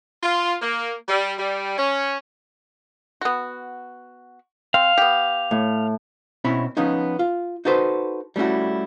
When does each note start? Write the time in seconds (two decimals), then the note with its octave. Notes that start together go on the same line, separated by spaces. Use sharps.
0.23 F4
0.62 A#3
1.09 G3
1.39 G3
1.78 C#4
3.21 B3 F#4
4.74 C4 F5
4.98 B3 G4
5.51 A2
6.44 B2 C4 C#4 E4 C#5 B5
6.77 F3 B3 C#4 D#4
7.19 F4
7.65 D#4 F#4 A4 B4 C5
8.36 G3 A3 C#4 E4 F#4